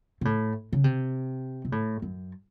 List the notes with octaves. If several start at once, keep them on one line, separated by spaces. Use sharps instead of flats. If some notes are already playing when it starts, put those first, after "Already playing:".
C3
A2
C#3
C3
C3
A2
F#2